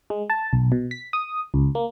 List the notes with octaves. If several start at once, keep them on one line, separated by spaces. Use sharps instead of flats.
G#3
A5
B1
B2
B6
D#6
C#2
A#3